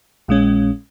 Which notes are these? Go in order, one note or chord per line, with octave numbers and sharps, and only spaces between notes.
A#1 A#2 G#3 C#4